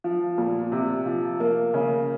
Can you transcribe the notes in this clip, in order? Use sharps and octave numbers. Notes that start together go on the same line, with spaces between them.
F3
A#2
C3
F3
A#3
C#3